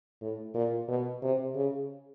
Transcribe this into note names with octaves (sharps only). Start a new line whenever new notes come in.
A2
A#2
B2
C3
C#3